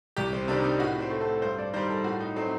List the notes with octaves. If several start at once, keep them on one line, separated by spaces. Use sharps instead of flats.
C2 G4
C4
C3 D#3 G3 D4
D#4
A2 F#4
C4
A3
A4
G2 C5
D5
D#3 G3 C5
A4
A2 F#4
D#4
F#3 A3 C4